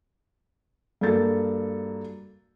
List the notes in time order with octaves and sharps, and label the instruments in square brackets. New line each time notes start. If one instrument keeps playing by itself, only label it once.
[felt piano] G2 A#3 F#4 A4 A6